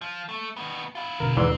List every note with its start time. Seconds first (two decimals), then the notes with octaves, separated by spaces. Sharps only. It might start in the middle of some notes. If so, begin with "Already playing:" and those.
0.01 F3
0.29 A3
0.56 D#3 B3
0.95 E4 F4
1.20 B2 D3 A#4
1.37 D#2 G#2 E3 C4 D5 C6